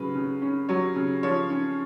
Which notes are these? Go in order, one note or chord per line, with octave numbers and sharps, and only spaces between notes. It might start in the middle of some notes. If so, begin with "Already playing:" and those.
Already playing: C#3 F#3 B4
C#3
C#4
F#3 C#5
C#3
F3 C#5
C#4